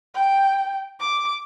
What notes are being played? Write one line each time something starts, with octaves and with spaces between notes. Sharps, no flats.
G5
D6